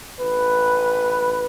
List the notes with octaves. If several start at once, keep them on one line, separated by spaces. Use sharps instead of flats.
A1 B4